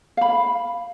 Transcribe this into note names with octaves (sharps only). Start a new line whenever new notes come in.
F5 B5